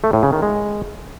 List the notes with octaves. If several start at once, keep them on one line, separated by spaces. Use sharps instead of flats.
A3
A2
C#3
D#3
G#3